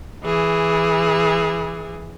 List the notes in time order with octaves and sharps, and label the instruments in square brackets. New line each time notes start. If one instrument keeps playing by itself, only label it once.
[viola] E3 G#4